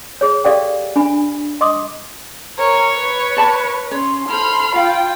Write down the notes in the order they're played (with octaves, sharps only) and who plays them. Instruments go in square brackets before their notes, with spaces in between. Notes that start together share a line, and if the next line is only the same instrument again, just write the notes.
[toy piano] G#4 C#5
G4 A4 D5 E5 F5 G5
D4 G#5 B5
D#5 C6 D6 D#6
[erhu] A#4 [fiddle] C#5
[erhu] B4
[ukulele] D5 A5 B5
[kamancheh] C#4 C6 [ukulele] C#5
[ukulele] E4 C5 [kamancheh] A4 F6 [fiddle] B5 [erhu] C6
[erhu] F4 [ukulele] F5 [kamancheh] G5